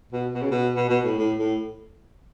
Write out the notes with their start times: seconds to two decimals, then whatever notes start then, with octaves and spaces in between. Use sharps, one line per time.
0.12 B2
0.34 B2
0.42 C#3
0.51 B2
0.75 B2
0.89 B2
1.04 A2
1.18 A2
1.38 A2